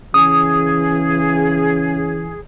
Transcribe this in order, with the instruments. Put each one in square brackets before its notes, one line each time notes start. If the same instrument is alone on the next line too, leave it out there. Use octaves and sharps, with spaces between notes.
[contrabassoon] C#3 [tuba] E3 [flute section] G#4 [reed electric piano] D#6